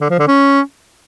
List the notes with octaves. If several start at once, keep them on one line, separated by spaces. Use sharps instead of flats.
D3
F3
D3
C#4